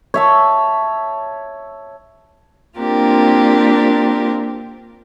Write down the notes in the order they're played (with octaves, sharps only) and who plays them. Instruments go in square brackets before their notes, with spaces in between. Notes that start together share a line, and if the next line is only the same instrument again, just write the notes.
[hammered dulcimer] C#5 E5 A5
[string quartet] A#3 C4 D4 F4 G4 A#4